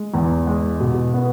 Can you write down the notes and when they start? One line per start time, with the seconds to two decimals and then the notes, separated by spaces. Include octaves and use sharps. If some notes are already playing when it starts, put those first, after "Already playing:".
Already playing: G#3
0.14 E2
0.47 G#3
0.80 B2
1.14 B3